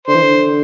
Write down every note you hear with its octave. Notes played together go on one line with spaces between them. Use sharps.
D3 C5
E3
D3